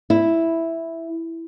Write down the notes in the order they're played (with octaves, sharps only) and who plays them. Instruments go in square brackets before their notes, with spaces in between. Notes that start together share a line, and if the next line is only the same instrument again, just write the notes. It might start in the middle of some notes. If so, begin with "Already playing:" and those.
[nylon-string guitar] E4